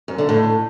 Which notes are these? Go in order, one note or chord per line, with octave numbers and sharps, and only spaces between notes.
F#2
D3
A2